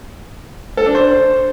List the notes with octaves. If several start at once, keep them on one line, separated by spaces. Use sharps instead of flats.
A4
D4
C5